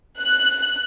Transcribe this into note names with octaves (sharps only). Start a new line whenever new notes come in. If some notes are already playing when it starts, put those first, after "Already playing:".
F#6